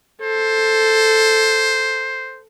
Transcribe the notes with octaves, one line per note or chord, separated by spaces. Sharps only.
A4 C5